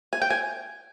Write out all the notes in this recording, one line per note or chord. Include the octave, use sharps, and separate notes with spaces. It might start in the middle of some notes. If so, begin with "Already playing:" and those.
G#5
G5
G#5